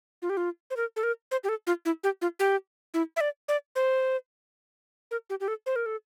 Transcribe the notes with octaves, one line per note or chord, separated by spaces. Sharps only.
F4
G4
F4
C5
A#4
A4
A#4
C5
G4
A4
F4
E4
G4
F4
G4
E4
E5
D5
D5
C5
A#4
G4
G4
A4
C5
A#4
A4